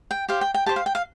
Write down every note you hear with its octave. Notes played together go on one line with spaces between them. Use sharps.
G5
G4 C5 F5
G5
G5
G4 C5 A5
F5
G5
F5